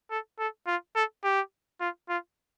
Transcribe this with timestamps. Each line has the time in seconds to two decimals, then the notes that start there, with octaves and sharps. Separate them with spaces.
0.11 A4
0.39 A4
0.67 F4
0.95 A4
1.24 G4
1.80 F4
2.09 F4